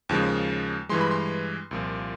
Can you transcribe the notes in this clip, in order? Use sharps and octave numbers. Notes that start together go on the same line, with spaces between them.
D#2 C#3 F3 G#3
G2 E3 G#3 C6
B5
C6
C2 A#2 F3